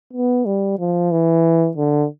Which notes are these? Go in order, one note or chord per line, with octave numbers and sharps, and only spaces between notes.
B3
G3
F3
E3
D3